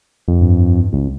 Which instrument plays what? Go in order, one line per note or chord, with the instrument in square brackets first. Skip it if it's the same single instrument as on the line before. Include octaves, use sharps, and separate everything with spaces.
[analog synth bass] F2
[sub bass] G2
[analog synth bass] C#2